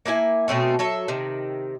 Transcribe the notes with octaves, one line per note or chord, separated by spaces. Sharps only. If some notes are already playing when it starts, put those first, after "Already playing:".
A#3 D4 E4 G#5
B2 A3 C4 C#4
F#3 A4 E5
C3 D#3